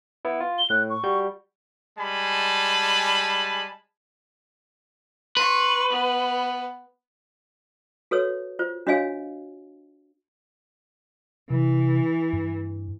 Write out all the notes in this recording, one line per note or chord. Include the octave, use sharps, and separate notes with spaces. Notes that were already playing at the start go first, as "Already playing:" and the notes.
B3 E4
F4
G7
A2 F#6
C#6
G3 F#4 G6
G3 G#3 G#5 A5 B5
B4 C6 C#6
B3
F#4 A4 B4 C#5 E6
F4 C5
D4 F#4 C#5 D#5 F5 G#5
C3 E3
G2